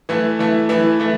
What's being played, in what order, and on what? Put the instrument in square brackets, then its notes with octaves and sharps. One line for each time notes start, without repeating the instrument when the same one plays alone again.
[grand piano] E3 A3 E4
E3 A3 E4
E3 A3 E4
E3 A3